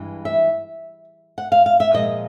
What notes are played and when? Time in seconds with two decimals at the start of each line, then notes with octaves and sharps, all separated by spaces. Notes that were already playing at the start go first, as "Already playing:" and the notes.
Already playing: G2 E3 G#3
0.25 E5
1.38 F#5
1.52 F5
1.66 F5
1.80 E5
1.93 A#2 F3 G#3 D#5